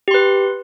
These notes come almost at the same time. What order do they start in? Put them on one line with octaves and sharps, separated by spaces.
G4 C6 B4